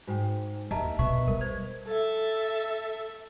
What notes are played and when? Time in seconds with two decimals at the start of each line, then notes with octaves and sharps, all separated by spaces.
0.07 G#2 F#4 C5 G5
0.71 D#2 A#4 D#5 E5 A5 A#5
0.99 B2 B4 D#5 E5 C#6
1.28 G3 A#4
1.41 C5 G#6
1.87 A4 E5